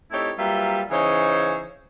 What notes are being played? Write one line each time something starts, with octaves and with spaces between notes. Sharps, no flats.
A3 C4 D#4 E4 G4 C#5
F#3 G3 A#3 F4 B4 E5
C#3 E3 D#4 G#4 C5 C#5